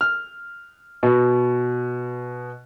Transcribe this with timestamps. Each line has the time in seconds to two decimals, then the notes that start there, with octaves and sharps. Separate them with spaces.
0.01 F6
1.03 B2